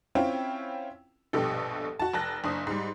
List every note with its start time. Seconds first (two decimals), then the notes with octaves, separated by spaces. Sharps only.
0.15 C4 C#4 E4 F4 G5
1.33 A#1 G2 B2 G4 A4
1.99 F#4 A5
2.14 F1 A5 F#6 A#6
2.44 F#1 D4 D#6
2.67 G#2 G3